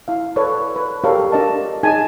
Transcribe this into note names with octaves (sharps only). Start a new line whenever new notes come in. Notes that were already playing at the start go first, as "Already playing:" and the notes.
E4 F5
A4 B4 C#5 D5
B4
G4 A4 A#4 C#5 D5 F5
D4 F4 A#4 D5 D#5 A5
D#4 G#4 G#5 A5